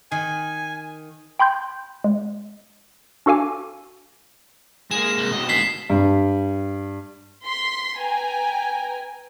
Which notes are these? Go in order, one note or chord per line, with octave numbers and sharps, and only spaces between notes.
D#3 G#5
G5 B5 C6 G6
G#3
D4 F#4 A4 F5 G#5 D6
G#3 A#3 G#4 E7
C2
D#2 B2 D#5
D2 G#3 B6 C7
G2
C6 B6
B4 G5 G#5 A#5